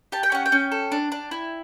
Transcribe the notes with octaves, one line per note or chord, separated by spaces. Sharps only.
G4 A5
G5
C#4 F#5
G5
C#4
A4
D4
D4
E4